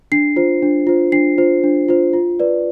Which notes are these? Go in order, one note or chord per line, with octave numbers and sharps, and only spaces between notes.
D4 C7
F4 C5
D4
F4 C5
D4 C7
F4 C5
D4
F4 C5
F4
B4 D5